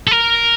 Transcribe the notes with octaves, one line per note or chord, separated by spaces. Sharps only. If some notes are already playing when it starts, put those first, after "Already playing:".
A4
A#4